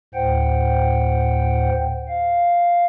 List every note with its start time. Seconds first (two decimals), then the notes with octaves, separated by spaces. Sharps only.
0.14 D2 A2 C5 F#5 G5
2.08 F5